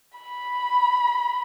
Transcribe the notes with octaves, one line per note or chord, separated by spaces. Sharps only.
B5